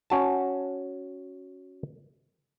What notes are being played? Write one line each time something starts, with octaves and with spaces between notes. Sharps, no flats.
C#4 F#4 A5